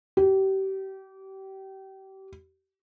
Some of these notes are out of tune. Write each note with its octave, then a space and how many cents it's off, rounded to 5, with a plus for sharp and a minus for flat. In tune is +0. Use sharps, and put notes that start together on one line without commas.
G4 -30